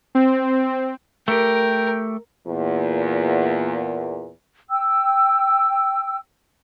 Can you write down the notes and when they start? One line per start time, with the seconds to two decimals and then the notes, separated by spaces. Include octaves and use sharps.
0.15 C4
1.28 A3 G4 A#4 G5
2.47 E2 A#2
4.69 G5 E6